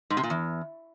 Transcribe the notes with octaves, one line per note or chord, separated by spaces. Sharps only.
G#2
C3
A#2
E2